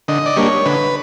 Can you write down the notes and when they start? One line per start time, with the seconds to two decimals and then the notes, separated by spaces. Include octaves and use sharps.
0.08 D3 D#5
0.26 D5
0.37 G3 A#3 D4 C#5
0.65 D3 B4